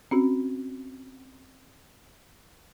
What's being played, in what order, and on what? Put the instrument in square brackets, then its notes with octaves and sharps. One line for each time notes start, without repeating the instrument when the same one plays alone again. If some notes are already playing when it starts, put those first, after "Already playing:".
[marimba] C4 C#4 F#4